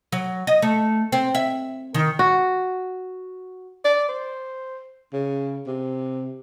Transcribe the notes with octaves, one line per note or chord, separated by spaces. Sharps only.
F#3
D#5
A3
C4
E5
D#3
F#4
D5
C5
C#3
C3